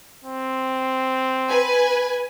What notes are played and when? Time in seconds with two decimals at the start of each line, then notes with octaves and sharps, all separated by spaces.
0.24 C4
1.50 B4 G#5